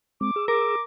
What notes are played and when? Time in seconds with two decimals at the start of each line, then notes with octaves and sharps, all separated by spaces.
0.21 G#3 C4 D6
0.36 G#4 E6
0.48 A#4 D6